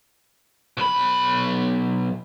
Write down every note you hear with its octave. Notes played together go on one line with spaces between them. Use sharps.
B1 B5